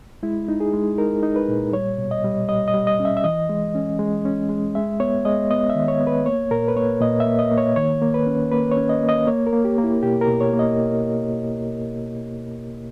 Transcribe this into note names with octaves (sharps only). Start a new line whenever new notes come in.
G#3 E4
D#4
G#4
G#3
D#4 A#4
D#4
B4
A#2
G3 C#5
B2
D#5
G3
G3 D#5
D#5
G3
D#5
C#4
E5
E5
E3 D#5
G#3
C#4
G#3
C#4
G#3
G#3 E5
B3 C#5
G#3 D#5
B3 D#5
E5
D#3
C#5
B3
B4
A#3 C#5
A#2 A#4
B4
A#3 C#5
A#2 D#5
E5
A#3
D#5
A#3
C#5
D#3 C#5
A#3
B4
C#4
A#3 B4
C#5
C#4
D#5
A#3
D#5
A#3 C#5
A#4
A#3
G4
A#3
E4
B2 G4
A#4
B2
C#5
A#3
D#5